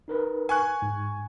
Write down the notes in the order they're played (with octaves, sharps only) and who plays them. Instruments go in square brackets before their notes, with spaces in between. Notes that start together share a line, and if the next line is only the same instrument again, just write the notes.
[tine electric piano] D#4 A#4 B4
[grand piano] G#5 C#6 F#6
[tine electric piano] G#2